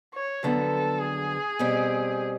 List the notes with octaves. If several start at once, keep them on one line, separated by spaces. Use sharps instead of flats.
C#5
F2 D3 F#3 B3 A4
G#4
B2 G3 C4